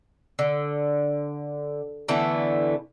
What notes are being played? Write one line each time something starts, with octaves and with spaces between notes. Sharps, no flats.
D3
D3 E3 A3 B3